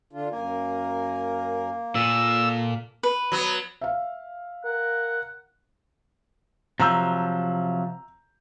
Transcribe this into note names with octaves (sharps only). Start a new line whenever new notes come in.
D3 D4 F4
F#2 A#3 A#4 G#5
A#2 A4 E6
B4
F#3 B3
E5 F5
A#4 F#5
C3 F3 F#3 A#5 E6 G6